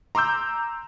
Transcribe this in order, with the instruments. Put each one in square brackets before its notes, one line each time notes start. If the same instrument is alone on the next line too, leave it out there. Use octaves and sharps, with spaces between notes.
[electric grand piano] A#5 C6 D6 E6 G6